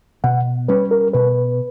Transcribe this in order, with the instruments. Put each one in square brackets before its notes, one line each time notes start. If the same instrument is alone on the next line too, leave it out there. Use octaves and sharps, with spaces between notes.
[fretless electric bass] B2 [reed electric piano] F#5
[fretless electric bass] G3 C#4 [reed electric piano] B4
[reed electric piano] A#4
[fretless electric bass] B2 [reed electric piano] B4